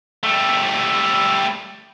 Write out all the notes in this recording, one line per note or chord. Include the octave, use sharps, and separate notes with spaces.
G3 A3